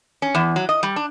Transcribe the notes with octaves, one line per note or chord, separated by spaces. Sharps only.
C#4
E2
F#3
D#5
G3
D4